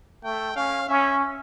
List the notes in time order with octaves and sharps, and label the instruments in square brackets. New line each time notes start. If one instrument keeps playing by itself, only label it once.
[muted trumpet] A3 [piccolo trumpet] G5
[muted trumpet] C#4 [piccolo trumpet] F5
[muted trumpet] C#4 [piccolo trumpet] E5